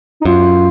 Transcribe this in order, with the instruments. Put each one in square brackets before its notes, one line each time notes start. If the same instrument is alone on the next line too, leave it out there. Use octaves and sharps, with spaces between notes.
[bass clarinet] D#4
[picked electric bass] F#2 [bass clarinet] F4